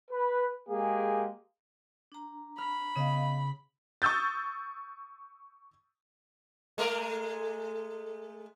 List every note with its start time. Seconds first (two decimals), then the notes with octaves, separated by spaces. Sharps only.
0.11 B4
0.69 G#3 A#3 G4 G#4
2.12 D4 A#5
2.58 B5 F6
2.96 C#3 B3 D#5 F5
4.02 C#6 D#6 E6 G6 A6
6.78 G#3 A3 A#4